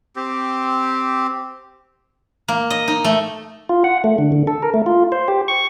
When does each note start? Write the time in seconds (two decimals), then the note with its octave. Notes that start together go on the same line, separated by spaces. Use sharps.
0.16 C4 G4
2.48 A#3
2.70 D#5
2.88 D#4
3.04 A3
3.69 F4
3.84 F#5
4.04 A3
4.18 D3
4.32 D3
4.47 A4
4.63 A#4
4.74 A3
4.86 F4
5.12 C5
5.28 G4
5.48 C#6